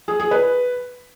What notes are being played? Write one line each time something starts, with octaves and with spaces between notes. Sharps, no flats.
G#4
G#4
B4